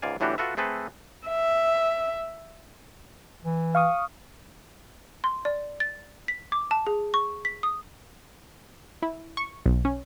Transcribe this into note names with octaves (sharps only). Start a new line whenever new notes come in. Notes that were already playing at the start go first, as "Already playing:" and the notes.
C#2 G#2 D5 F5 G#5
G1 A2 E3 D4 F#4 G4
F4 F#4 A4 B4 E5
A3 C4 G#4 A4 B4
E5
E3
F5 C#6 D#6
C6
D5
A6
B6
D6
A5
G#4
C#6
B6
D#6
E4
C#6
B1
C#4